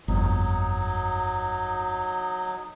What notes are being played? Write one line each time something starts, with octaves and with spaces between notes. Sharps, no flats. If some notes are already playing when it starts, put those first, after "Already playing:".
G1 F2 F#3 D#4